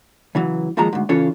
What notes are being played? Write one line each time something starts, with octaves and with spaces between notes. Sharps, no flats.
C#3 E3 F#3
D#2 F3 F#3 G#3 A#5
D2 G#2
C#3 E3 C#4 F4 A4 C#5